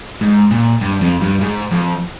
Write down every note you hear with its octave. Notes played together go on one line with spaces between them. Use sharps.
G#2
A#2
G2
F2
G2
G#2
F2